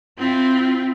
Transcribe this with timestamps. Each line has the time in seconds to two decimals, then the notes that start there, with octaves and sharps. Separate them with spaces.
0.19 C4 E4 F4